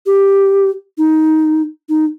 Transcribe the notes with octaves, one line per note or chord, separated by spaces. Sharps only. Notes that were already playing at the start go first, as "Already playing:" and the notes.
G4
D#4
D#4